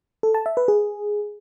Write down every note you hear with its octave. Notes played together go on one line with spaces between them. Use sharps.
A4
A5
E5
B4
G#4